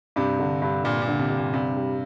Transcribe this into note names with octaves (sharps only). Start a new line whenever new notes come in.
G2 C3
D3
G2
G2 A#2
A#2
D3
C3
G2
A#2
G2 C3
G3